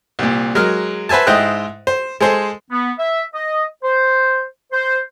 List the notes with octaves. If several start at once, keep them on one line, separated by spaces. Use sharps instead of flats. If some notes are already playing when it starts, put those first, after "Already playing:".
C2 A#2
F#3 G#3 A#4 F6
B4 C5 E5 G#5 A5
G#2 E4 C5 D#5 G5 F#6
C5
G#3 G#4 A4 C5
B3
E5
D#5
C5
C5